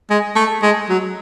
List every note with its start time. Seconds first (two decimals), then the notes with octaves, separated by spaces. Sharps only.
0.10 G#3
0.36 A3
0.63 G#3
0.89 F#3